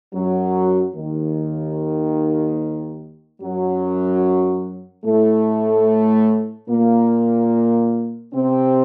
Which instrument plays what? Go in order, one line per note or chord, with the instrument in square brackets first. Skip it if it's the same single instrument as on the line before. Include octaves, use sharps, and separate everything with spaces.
[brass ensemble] F#2 F#3
D#2 D#3
F#2 F#3
A2 A3
A#2 A#3
C3 C4